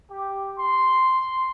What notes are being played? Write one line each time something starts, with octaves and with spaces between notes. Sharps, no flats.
G4
C6